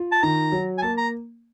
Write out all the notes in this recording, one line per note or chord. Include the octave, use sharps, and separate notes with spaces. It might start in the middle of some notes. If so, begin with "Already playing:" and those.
Already playing: F4
A5
D#3 A#5
F#3
G#5
A#3 A5
A#5